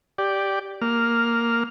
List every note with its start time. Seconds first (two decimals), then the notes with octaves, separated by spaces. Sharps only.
0.18 G4 D5
0.81 A#3 F6